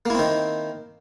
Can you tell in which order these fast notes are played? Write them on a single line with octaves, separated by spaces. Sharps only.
A#3 E4 C4 D#3